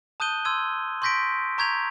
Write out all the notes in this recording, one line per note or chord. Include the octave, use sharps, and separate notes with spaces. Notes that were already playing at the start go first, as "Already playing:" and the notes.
A5 D#6 F#6 G6 D#7 G7
C6 E6 G#6 D#7
C6 C#6 G6 A#6 B6 D7
A#5 C#6 G6 G#6 B6 F7